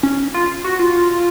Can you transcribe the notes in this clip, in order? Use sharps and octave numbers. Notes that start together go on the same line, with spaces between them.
C#4
F4
F#4
F4